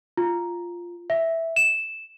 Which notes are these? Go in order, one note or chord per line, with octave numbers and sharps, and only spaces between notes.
F4
E5
E7